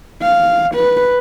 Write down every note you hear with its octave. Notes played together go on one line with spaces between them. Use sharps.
F5
B4